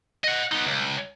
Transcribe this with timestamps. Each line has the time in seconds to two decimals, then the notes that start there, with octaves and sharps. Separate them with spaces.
0.24 D#5 F#5
0.52 B3 D#4
0.66 C#2